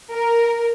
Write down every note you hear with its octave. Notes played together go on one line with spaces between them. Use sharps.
A#4